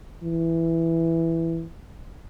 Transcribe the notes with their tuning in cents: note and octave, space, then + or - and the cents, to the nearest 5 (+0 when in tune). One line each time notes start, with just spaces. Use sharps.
E3 +5